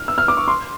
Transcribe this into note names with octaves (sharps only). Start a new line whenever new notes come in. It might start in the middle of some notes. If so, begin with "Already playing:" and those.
Already playing: F6
E6
F6
D6
C#6
C6